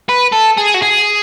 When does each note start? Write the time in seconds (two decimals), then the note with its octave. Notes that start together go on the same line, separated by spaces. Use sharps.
0.09 B4
0.32 A4
0.57 G#4
0.74 F#4
0.82 G#4